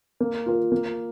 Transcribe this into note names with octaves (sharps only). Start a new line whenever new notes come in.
A#3
F4 A#4
A#3